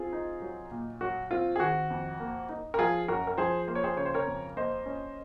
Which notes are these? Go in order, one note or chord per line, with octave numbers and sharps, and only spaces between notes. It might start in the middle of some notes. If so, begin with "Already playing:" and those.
Already playing: C4 F4 G#4
D#4
F#3
A#2
F#3 F#4
C4 F4
G#4
D#3 F#4
F2
A#3
D#4
A#4
F3 F4 G#4
F#2 F#4 A#4
A#4
F3 G#4 C5
A#3 C5
C#5
G#4 C5
C#3 C#5
C5
A#4 C#5
F2
A#3 C5 D#5
C#4